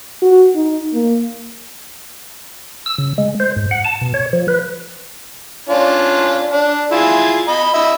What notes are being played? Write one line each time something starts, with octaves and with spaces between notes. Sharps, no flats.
F#4
D#4
A#3
E6
C#3
G#3
C5
G#2
F#5
A5
B2
C#5
F3
B4
C#4 D4 F4
D4
E4 F4 G#4
D#5 B5
D#5 E5 B5